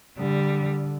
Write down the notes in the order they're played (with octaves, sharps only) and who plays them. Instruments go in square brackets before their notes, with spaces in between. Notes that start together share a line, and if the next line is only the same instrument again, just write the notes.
[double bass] D3 [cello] G3